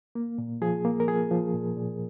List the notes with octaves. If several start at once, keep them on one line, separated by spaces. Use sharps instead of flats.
A#3
A#2
F3 G#4
A#3
A#4
F3 G#4
F3
A#2
A#2